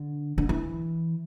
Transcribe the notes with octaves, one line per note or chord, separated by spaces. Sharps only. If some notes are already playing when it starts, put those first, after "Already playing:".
Already playing: D3
D3
E3